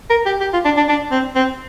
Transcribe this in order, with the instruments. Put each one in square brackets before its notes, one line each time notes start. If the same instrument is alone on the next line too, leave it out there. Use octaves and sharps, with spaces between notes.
[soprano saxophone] A#4
G4
G4
F4
D4
D4
D4
C4
C4